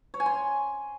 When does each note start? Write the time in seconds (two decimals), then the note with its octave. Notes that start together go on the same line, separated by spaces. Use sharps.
0.14 C#5
0.20 G#5
0.26 C6